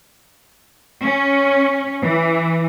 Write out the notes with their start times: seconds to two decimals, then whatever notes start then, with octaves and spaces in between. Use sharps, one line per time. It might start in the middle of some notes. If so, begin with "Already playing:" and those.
1.04 C#4
2.03 E3